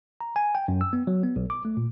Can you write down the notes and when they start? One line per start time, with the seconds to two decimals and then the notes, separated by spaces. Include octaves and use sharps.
0.21 A#5
0.36 G#5
0.55 G5
0.68 F#2
0.81 E6
0.93 B3
1.07 F#3
1.23 B3
1.36 B1
1.50 D6
1.65 A3
1.77 A#2